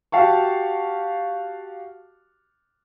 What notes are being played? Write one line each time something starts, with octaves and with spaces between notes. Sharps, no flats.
F#4 G4 F5 A5 C#6